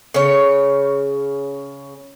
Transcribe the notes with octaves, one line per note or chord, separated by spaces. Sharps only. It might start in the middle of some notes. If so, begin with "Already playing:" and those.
C#3 C#5